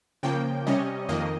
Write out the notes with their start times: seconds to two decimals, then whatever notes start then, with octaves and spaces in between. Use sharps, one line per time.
0.23 C#3 F3 A#3 G5
0.67 C3 G3 C#4 D#5
1.09 F2 D#3 A#3 D#5